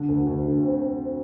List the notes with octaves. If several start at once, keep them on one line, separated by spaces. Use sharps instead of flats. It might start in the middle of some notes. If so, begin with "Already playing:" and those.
Already playing: D3
D2
D2
D3
C4
C4